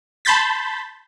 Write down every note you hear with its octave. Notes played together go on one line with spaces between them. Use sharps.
A5 B5 C6 G6 A6 B6